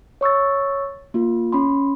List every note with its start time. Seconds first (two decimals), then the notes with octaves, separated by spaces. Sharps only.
0.21 C#5 C#6 E6 A6
1.14 A#3 F4
1.53 C#4 B5 C6